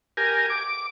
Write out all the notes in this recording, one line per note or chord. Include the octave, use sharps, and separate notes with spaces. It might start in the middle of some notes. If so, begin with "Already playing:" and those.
G4 A#4 G#5
D6